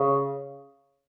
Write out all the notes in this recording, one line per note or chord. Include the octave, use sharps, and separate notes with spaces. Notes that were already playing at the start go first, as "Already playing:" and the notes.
Already playing: C#3